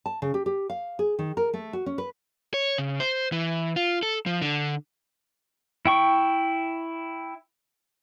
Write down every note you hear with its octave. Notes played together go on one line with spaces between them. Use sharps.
A5
C#3
G4
G4
F5
G#4
D#3
A#4
A3
F#4
C#4
B4
C#5
C#3
C5
E3
F4
A4
F3
D3
E4 G5 C#6